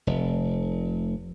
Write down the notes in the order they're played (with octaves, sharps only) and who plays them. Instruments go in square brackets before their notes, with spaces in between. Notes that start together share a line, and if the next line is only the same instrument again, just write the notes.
[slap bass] F1